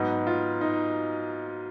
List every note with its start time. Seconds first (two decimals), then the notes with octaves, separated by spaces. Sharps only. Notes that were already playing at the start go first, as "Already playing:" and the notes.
Already playing: G#2 F#3 B3 D#4
0.27 F4
0.61 D#4